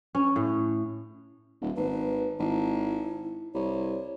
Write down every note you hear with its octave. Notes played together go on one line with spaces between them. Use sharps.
C#4
A2
D#1
G#1 B4
G#1 E4
C2 C#5